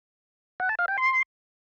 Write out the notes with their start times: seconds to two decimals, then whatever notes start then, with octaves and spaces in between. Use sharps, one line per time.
0.60 F#5
0.69 A5
0.79 F5
0.88 G5
0.98 C6